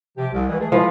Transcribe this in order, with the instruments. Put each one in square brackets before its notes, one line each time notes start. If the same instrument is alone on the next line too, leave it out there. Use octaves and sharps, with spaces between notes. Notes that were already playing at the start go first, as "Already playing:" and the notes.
[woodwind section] C3 F3 G4
C2
C#2 E3
A3 G#4
[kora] F3 [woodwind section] G#3 B4